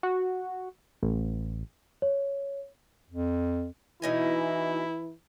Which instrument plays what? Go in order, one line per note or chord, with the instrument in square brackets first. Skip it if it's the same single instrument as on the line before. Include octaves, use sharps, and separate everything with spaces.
[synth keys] F#4
A1
[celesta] C#5
[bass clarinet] F2
[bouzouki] B2 D#4 G#5 [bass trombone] E3 [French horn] E4